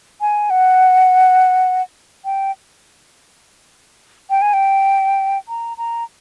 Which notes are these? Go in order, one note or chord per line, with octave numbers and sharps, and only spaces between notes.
G#5
F#5
G5
G5
G#5
G5
A#5
A#5